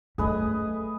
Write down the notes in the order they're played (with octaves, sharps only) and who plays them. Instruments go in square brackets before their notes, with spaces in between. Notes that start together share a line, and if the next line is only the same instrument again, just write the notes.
[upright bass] F#3 C#4 [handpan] A3 [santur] G#4 B4 D#5